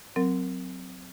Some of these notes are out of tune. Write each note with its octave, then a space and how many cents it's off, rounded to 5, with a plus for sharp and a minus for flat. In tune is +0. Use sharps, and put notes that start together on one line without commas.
F#3 +0 C4 -10 A#4 -15